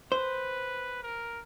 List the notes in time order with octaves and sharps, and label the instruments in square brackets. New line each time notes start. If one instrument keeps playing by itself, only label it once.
[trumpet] B4 [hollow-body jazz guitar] C5
[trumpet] A#4